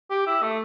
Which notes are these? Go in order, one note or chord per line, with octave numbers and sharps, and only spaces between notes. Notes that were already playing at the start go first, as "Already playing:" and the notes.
G4
E4
A3